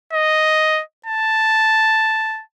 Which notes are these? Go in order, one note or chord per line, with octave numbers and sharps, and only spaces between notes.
D#5
A5